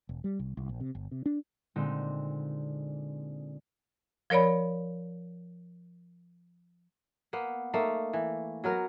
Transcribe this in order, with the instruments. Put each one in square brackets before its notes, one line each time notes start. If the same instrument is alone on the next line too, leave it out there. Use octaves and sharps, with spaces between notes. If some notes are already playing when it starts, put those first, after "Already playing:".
[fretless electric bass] E1
G3
C2
C2
A#1
C3
G1
C3
D4
[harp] A#2 D3 G#3 C4 D#4
[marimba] F3 A#4 C#5 D5 B5
[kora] A#3 B3
A3 A#3 D#4
E3
F#3 B3 A#4